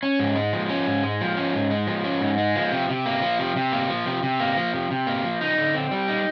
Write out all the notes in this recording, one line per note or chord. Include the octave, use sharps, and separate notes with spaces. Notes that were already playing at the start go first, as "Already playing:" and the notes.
C#4
G#2
G#3
F3
C#4
G#2
G#3
F3
C#4
G#2
G#3
F3
C#4
G#2
G#3
F3
C3
C3
A#3
F3
C3
C3
A#3
F3
C3
C3
A#3
F3
C3
C3
A#3
F3
D#4
D3
C4
G3
D#4